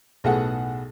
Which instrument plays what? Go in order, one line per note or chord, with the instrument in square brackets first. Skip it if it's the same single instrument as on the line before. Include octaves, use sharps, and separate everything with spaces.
[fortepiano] B1 A2 G#4 A4 F#5